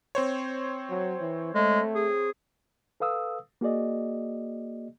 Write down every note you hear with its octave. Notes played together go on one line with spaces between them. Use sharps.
C4 C5 C#5
F#3
E3
G#3 A3
G#4
A4 B4 F5 D#6 E6
A#3 F#4 G#4 D5 D#5